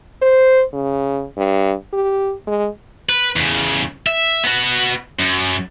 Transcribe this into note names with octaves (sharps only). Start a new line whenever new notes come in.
C5
C#3
G2
G4
G#3
B4
E2 C#3
E5
B3 F#4
F#2